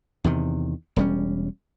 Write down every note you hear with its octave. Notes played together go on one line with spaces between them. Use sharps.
E2 C3 D#3
E1 G3 C#4